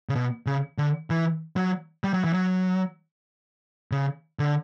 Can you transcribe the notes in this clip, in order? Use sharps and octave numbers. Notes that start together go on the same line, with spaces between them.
C#3
B2
C#3
D3
E3
F#3
G3
F#3
E3
F#3
C#3
D3